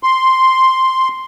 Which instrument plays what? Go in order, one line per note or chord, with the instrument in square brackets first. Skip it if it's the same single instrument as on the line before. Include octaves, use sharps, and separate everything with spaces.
[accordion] C6